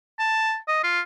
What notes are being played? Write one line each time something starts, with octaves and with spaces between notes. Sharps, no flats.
A5
D#5
F4